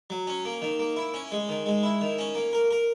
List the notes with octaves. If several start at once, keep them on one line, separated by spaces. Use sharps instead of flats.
F#3
C#4
A#3
D#3
A#3
E4
C#4
G#3
D#3
G#3
E4
D#3
C#4
A#3
A#4
A#4